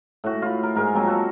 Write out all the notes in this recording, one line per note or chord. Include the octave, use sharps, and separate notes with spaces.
A2 F#4
F4 B5
A#4
G#2 A#4 G#5
F3 F#3 A#3 C4
F#4 A4